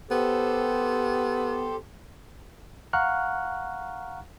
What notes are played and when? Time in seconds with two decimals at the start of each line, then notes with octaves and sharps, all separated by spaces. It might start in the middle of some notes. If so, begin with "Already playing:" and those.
0.11 B3 G4 A4 C5
2.93 F5 F#5 A#5 C#6 F6 F#6